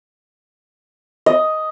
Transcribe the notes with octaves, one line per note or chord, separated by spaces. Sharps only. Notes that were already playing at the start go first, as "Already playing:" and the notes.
D#5